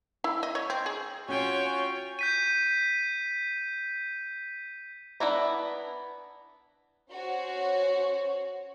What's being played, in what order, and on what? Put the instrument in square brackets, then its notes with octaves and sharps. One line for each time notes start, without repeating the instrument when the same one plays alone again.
[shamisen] E4
D#5
C#5
C4
G#4
[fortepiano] C#4 [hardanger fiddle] F4 G#5 [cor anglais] F#4 [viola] C#5 G5
[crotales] G6 B6 D#7
[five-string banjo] B3 D4 E4 A#5
[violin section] C#4 F#4 C5 C#5